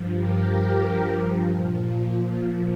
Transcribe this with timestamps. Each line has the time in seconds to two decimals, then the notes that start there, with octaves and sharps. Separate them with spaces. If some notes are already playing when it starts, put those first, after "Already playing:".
Already playing: G2 F3
0.15 G4 A#4
1.50 A#2 F3